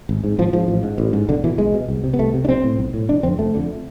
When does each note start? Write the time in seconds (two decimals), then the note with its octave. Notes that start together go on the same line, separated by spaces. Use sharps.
0.09 G#1
0.24 G#2
0.39 G#1 F3
0.53 G#2 F3
0.68 A1
0.83 G#2
0.98 A1
1.13 G#2
1.29 B1 D3
1.44 B2 E3
1.58 B1 G#3
1.74 B2
1.89 C2
2.04 C3
2.14 B3
2.19 C2 A3
2.34 C3
2.45 D4
2.48 B1 C4
2.64 A2
2.79 B1
2.94 A2
3.09 F1 D4
3.23 F2 D3 C4
3.39 F1 A3
3.54 F2 D3